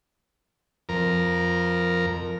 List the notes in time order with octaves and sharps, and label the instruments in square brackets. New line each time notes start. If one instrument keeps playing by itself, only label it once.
[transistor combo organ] F2 A#4